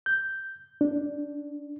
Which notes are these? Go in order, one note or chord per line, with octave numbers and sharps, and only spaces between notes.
G6
D4